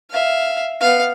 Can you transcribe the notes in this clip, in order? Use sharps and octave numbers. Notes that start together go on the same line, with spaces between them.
E5 F5
B3 F5